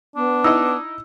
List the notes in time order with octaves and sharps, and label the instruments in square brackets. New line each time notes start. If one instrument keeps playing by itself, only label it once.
[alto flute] B3 [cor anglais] D4
[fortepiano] D#4 E4 D#5 [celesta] E6